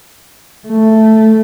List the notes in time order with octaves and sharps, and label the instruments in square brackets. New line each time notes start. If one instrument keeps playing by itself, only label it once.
[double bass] A3